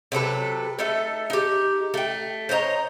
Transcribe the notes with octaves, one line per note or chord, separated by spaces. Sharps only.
C3 F#3 A4 B4
A3 D#4 A4 E5
D#4 G4
A3 G5
C5 C#5 D#5 A#5